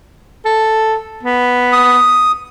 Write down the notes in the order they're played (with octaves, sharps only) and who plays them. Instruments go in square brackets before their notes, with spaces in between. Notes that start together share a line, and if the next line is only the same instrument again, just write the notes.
[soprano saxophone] A4
B3
[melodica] D#6